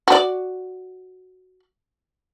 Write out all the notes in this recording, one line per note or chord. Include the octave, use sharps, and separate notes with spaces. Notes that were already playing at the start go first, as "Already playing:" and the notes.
F#4 D5